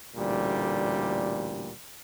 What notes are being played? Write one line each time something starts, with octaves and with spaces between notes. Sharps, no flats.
A1 D2 A#2 G3